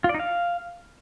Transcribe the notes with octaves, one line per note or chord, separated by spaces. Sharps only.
F4
D5
D#4
F5